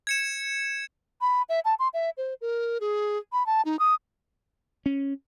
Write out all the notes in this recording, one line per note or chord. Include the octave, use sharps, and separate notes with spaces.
G#6 C#7 E7
B5
E5
A5
C6
E5
C5
A#4
G#4
B5
A5
D#4
D#6
C#4